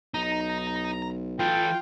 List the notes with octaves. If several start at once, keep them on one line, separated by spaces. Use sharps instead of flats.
B1 D#4 A#5
E3 F4 A4 G5